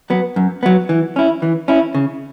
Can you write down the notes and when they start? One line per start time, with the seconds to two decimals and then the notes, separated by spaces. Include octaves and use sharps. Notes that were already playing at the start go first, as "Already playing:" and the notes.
0.10 F#3 B3
0.36 F#2
0.63 F#3 B3
0.89 E3
1.16 C#4 E4
1.42 E3
1.68 C#4 E4
1.95 C#3